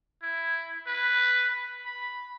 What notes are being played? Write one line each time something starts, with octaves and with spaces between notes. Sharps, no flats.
E4
B4
B5